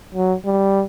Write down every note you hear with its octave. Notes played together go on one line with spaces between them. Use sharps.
F#3
G3